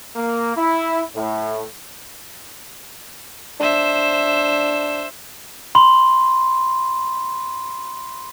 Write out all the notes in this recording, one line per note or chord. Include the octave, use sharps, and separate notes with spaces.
A#3
E4
A2
D4 C5 E5
B5 C6